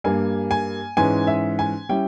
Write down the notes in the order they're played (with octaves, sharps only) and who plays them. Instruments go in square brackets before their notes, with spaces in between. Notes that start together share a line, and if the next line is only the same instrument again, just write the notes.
[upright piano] G2 G3 A#3 G#5
G#5
G#2 E3 G#3 C#4 G#5
E5
G#5
G3 C#4 E4 G5